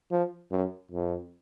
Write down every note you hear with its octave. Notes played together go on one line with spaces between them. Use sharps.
F3
F#2
F2